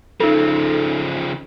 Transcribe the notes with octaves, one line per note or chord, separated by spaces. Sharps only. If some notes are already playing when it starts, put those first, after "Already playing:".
C#3 F3 D#4 A4